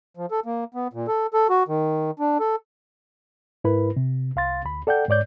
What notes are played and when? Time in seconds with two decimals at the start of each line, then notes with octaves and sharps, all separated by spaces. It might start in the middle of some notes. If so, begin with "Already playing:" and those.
0.17 F3
0.31 A4
0.46 A#3
0.74 B3
0.93 A#2
1.08 A4
1.34 A4
1.50 F#4
1.68 D#3
2.19 D4
2.40 A4
3.64 G#2 E4 A#4 B4 B5
3.96 C3
4.36 C2 F5 C6 A6
4.65 D2 B5
4.87 A4 D5 F#5 G5 G6
5.09 G#2 C#5 D5 G6